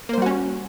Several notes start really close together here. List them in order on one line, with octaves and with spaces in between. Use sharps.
A#3 C5 G3 F#4 C#4